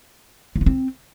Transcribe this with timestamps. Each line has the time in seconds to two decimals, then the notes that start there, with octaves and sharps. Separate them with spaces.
0.56 A#3
0.61 B3
0.66 C4